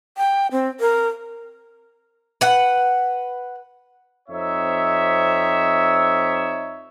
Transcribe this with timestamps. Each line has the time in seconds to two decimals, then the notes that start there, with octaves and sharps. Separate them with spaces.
0.18 G5
0.51 C4
0.80 A#4
2.41 B4 F#5
4.29 F2 C4 D#4 C#5 E5